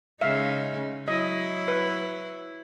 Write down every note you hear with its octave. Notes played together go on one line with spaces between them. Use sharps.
C#3 G#3 D#4 E5 F5
F#3 E4 D#5
B4